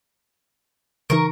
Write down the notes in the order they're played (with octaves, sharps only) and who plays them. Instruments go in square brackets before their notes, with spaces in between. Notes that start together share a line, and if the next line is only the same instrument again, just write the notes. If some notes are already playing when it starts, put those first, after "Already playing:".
[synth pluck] C#3 E3 D#4 [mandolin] A#4 C#6